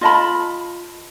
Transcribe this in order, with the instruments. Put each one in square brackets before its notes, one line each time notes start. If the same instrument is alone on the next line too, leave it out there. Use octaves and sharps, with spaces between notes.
[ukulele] F4 D#5 A5 B5